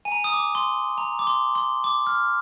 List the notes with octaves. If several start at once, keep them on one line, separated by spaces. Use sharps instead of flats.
G#5
A#5
D#6
D6
C6
A#5
D6
C6
C6
D6
F6